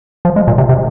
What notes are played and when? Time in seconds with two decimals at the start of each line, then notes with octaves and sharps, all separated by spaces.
0.25 F3
0.36 G#3
0.48 A#2
0.58 C3
0.69 C3